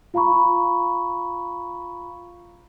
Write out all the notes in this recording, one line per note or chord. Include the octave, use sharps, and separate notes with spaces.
F4 F5 A#5 B5 C#6